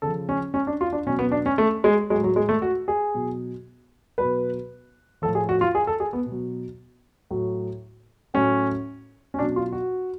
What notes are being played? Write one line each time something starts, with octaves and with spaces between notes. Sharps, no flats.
C#3 F3 A4
C#4
C#4
D4
F4
D4
B2 F#3 C#4
B3
D4
C#4
A3
G#3
F#3 G#3
A2
F#3
G#3
A3
F#4
G#4
B2 F#3
B2 F#3 B4
A2 F3 A4
G#4
F#4
F4
G#4
A4
G#4
B3
B2
F#3
A2 F#3
A2 F#3 C#4
C#4
B2 F#3 D4
F4
F#4